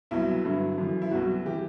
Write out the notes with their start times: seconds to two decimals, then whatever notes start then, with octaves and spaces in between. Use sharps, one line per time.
0.11 C2 B2 F#3 E4
0.44 G2 D3 F#3
0.78 F#2 E3
1.02 E4
1.11 C2 B2 F#3 F#4
1.45 E3 G4